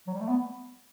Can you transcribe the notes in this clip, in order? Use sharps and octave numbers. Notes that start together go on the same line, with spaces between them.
F#3
G3
A3
B3